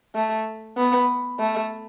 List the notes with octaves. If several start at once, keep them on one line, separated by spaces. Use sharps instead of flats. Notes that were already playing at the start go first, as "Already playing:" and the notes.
A3
B3
A3